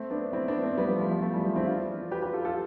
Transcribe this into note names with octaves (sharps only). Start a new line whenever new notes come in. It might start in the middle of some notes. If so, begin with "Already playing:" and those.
Already playing: A3 C4
B3 D4
C4 E4
B3 D4
A3 C4
G3 B3
F3 A3
F3
F3
F3 A3
E3 G3
F3
C4 E4
D4 F4
G4 B4
G4 B4
F4 A4
F4 A4